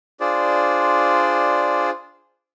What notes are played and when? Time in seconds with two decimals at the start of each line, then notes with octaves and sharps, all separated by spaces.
0.20 D4 F4 G#4 C5 D5